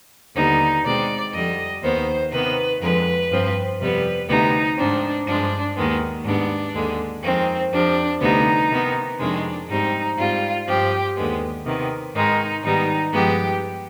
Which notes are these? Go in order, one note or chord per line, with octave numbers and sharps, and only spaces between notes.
D#2 D3 G3 B3 D#4
B2 G#3 C4 D5
F2 D3 G3 D#5
D#2 D#3 B3 C5
C3 D#3 B3 B4
F2 D3 G#3 B4
G2 F3 C4
F2 C3 G3 B3 B4
D2 C3 G3 B3 D#4
G#2 F3 C4 D4
G2 F3 G#3 D4
D#2 D#3 G#3 B3
G#2 G3 B3 D4
D#2 D3 G#3
F2 D#3 G#3 C4
F2 C3 F3 D4
D2 C3 G3 B3 D#4
C3 D#3 B3
F2 C3 D#3 G#3 D4
G#2 G3 C4 D#4
G#2 G3 C4 F4
G2 F3 C4 G4
D#2 D3 G#3 B3
C3 D#3 B3
G#2 D#3 G#3 D#4
G#2 D#3 G3 B3 D#4
G2 F3 G#3 B3 G4